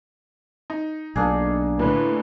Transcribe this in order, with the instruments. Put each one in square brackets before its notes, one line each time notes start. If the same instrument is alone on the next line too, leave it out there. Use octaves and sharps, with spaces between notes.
[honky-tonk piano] D#4
[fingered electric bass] B1 [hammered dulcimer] A#3 D4 G#4
[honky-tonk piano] A2 D3 [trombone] B4